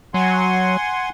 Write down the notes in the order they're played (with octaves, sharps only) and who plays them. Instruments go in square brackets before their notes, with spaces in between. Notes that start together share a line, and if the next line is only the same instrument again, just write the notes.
[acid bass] F#3 [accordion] F#5 G#5 C6